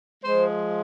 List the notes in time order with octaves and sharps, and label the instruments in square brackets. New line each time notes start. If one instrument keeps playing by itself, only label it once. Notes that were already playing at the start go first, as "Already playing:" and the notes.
[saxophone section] F3 G#3 C5